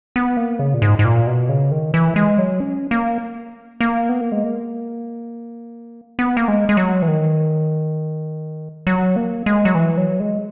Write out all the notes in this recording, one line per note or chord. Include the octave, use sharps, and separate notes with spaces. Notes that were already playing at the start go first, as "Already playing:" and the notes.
B3
A#3
C#3
A#2
G#2
G#2
A#2
B2
C#3
D#3
E3
G#3
F#3
C#4
A#3
A#3
B3
A#3
G#3
A#3
B3
A#3
G#3
G#3
F#3
E3
D#3
F#3
A#3
G#3
F#3
E3
F#3
G#3